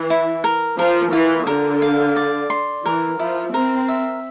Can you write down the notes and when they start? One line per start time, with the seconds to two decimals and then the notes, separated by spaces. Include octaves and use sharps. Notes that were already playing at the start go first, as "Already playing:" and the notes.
Already playing: E3
0.10 E4
0.44 A#4
0.79 F3 A#4
1.13 E3 F4
1.47 D3 A#4
1.82 F5
2.16 D5
2.50 C6
2.85 E3 A#4
3.19 F3 E4
3.54 C4 A#4
3.88 E5